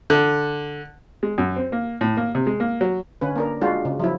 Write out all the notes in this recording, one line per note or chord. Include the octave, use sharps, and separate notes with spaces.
D3
G#3
F#2
C4
A#3
A2
A#3
C3
G#3
A#3
F#3
D3 C#4 B4
A#3 D4 A#4
G#3 D4 F4 F#4
C#3
F3 F#3 E4